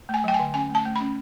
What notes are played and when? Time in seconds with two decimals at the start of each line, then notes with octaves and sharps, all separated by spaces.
0.09 A3 G#5
0.24 F#3 G5
0.34 G#5
0.39 D3
0.54 C#4 G#5
0.69 A3
0.75 A5
0.85 A3
0.96 C#4 B5